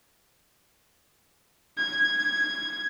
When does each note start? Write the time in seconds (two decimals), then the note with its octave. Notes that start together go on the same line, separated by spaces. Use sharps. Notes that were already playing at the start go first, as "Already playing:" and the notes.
1.78 G#6